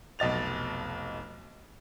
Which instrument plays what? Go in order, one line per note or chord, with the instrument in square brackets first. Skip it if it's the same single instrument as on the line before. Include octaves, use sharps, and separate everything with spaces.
[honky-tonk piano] F1 B1 D#5 A6 F7